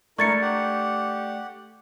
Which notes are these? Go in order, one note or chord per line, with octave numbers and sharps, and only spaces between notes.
A3 D4 E4 A#4 C#6 G#6 A6 C#7
G4 F#5